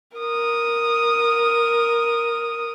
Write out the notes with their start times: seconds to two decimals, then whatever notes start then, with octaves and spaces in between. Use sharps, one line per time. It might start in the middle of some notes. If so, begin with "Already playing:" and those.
0.17 A#4 D#6